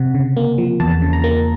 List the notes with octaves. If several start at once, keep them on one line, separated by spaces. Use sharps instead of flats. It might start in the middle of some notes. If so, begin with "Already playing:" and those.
Already playing: C3 F#5
C#3
A#3
F3
E2 A5
C#3
A#5
A#3